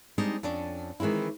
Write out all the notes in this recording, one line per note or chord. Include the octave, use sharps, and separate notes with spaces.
G3 G#3 C4 D4 D#4
F2 C#4 D4
D#3 E3 G#3 C4 E4